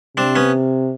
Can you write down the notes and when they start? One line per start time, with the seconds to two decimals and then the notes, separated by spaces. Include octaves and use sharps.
0.17 C3 C4 D4
0.36 B3 C#4